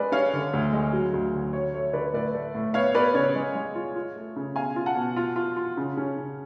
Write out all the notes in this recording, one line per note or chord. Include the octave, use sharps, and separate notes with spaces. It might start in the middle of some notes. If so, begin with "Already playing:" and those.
Already playing: G#3 C#4 B4 D5 F5
C#4 C#5 F5
D3
D2
G#3
F#3
D2
D3
F#3 C#5
A3 C#5
D3 B4 D5
A2 B4 D5
A3
A2
B3 C#5 F5
B3 B4 D5
C#3 C#5
G#3
G#3
F4
F4
A3
C#3
B2 F5 G#5
F4
F#5 A5
B2
F4
F4
F4
C#3
C#4
C#3